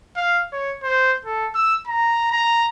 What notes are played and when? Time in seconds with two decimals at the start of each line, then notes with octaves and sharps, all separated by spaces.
0.16 F5
0.53 C#5
0.83 C5
1.25 A4
1.55 E6
1.87 A#5
2.32 A#5